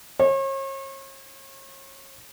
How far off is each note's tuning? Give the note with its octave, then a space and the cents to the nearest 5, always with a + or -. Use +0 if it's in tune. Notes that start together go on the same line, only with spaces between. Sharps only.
C#5 -40